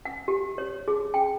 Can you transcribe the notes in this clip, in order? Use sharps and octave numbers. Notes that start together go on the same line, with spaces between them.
F#5
G4
C#5
G#4
G5